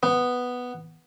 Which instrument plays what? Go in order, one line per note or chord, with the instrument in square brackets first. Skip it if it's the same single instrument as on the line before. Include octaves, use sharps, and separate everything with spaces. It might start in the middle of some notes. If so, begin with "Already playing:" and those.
[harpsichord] B3